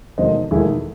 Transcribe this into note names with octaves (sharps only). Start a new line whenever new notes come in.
E1 E2 D#3 A3 C5 D#5
E1 E2 D#3 A3 E4 G#4